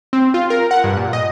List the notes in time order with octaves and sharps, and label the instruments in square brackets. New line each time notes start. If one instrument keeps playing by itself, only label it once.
[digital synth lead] C4
F4
A#4
F#5
G2
A#2
D#5